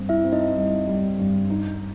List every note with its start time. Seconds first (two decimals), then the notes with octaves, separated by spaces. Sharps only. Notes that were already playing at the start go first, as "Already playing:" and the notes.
Already playing: G2 C4
0.09 E4 E5
0.24 C4
0.33 D#4 D#5
0.56 G3
0.87 G3
1.19 G2
1.50 D#4